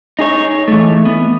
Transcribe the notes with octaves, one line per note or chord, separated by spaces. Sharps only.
D#4 G#4 C#5
E3 A3
B3